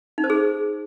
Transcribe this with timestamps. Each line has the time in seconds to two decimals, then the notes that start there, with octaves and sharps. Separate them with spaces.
0.18 D#4
0.24 C5
0.30 G#4